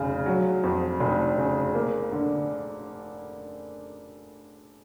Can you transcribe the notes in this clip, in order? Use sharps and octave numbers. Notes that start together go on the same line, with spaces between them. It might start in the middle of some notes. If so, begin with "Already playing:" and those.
Already playing: F1 C#3
F#3
F2
F1
C#3
A#3
D3